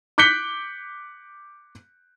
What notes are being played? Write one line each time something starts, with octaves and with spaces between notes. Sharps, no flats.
D6 F#6 G6 B6 C#7 G7